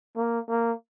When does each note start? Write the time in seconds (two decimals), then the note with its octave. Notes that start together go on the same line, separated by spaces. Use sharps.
0.16 A#3
0.49 A#3